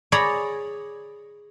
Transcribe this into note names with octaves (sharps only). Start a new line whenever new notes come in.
G#4 C#5 D5 A#5 B5